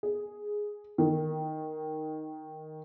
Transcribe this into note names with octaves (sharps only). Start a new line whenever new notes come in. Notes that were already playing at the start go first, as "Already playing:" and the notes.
G#4
D#3